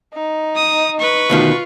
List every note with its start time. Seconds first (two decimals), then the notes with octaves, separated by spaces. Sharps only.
0.14 D#4
0.56 D#6
0.99 B4 C#6
1.30 D2 B2 D#3 F4